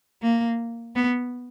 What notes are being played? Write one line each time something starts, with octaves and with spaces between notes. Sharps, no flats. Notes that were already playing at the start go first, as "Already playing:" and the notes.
A#3
B3